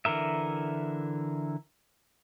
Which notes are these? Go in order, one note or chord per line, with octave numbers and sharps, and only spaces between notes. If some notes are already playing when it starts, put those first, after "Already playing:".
D3 E3 A#4 E5